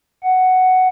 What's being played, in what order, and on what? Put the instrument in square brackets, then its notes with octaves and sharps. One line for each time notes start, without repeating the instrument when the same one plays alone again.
[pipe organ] F#5